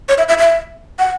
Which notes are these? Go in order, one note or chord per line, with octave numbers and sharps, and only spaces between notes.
C#5
E5
E5
E5
F#5